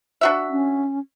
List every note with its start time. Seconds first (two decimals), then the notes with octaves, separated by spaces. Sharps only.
0.21 D4 F#4 E5
0.50 C#4